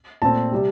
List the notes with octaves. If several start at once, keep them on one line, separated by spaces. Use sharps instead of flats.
A#2 A3 C4 A5
C3 G3